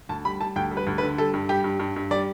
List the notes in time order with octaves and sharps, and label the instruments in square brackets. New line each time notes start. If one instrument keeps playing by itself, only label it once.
[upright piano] D2 A5
G3 B5
G3 A5
D2 G5
G3
B4
D2
B4
D3
G3 A4
G2
G3 G4
G2
G2
G2
G3 D5